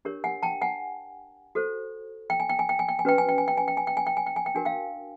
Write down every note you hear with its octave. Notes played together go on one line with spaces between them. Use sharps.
D4 G4 A#4 C#5
F#5 G#5
G5 A5
F#5 G#5
F#4 A4 C5
G5
G#5
G5
G#5
G5
G#5
G5
G#5
C#4 F#4 B4 G5
G#5
G5
G#5
G5
G#5
G5
G#5
G5
G#5
G5
G#5
G5
G#5
G5
D4 F#4 A#4 G#5
F5 G5